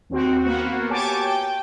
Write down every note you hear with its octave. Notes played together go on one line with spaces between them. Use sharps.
D#2 C4 F#4
A#3 B3 F#4
G4 C#5 G#5 A5 D6
G5